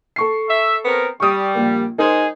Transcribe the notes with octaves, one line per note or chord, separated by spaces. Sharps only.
A4 C#6 C7
E5
B3 C4 A#4
G3 C#6 D#6
A#1 A#3
G#3 D#4 G#4 A#4 C5